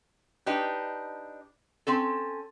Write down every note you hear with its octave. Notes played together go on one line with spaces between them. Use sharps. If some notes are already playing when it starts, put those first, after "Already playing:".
D4 D#4 G4 B4
C4 C#4 A4